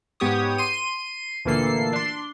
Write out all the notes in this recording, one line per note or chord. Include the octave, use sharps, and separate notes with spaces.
G#2 B3 G4 C#5 D#6
C6 D#7
D2 A#2 E3 A#3 A4 C7
D4 C6